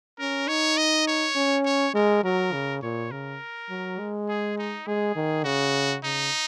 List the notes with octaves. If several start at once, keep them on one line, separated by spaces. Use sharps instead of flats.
C#4 A#4
D#4 C#5
D#5
C#5
C#4
C#5
G#3 A#4
F#3 A#4
C#3
A#2 C#5
C#3 A#4
F#3
G#3
G#4
D#4
G#3 G#4
D#3
C#3 F#4
C#3 D#4